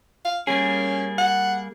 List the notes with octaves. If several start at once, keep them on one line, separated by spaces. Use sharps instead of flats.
F5
G3 A#3 C#4 G#4
F#5